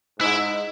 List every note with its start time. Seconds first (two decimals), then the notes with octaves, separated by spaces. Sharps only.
0.20 G#2 E4